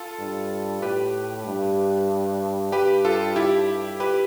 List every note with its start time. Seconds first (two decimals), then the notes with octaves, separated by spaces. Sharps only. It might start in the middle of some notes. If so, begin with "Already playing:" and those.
Already playing: F4 A4
0.20 G2
0.82 A2 G4 B4
1.46 G2
2.72 G2 G4 B4
3.05 F4 A4
3.36 E4 G4
4.00 G4 B4